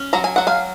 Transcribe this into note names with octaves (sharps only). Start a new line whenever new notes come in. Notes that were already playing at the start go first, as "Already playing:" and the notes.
Already playing: C#4
F#3 A#5
G#5
F#3 F#5
F5 G#5